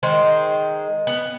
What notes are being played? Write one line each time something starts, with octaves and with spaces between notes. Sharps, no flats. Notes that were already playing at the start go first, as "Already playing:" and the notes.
D#3 G#3 C5
B3